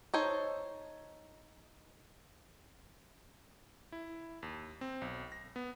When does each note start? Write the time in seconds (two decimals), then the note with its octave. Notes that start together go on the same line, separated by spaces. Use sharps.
0.14 D#4 A4 C5 C#5
3.92 E4
4.43 D#2
4.81 C4
5.02 B1
5.32 A#6
5.56 B3